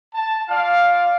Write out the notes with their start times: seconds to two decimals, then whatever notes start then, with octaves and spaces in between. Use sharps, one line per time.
0.14 A5
0.48 F4 D5 F5